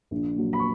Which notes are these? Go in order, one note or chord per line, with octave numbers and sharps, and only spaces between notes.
A#1
A#2 F#3
B5
C#6